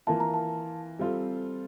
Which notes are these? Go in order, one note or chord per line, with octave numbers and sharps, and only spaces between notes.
E3 A#3 F4 A5
A#5
A5
G3 C4 F4 A4